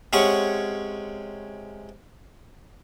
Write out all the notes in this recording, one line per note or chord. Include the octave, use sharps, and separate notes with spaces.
C3 G#3 C#4 F#5 C#6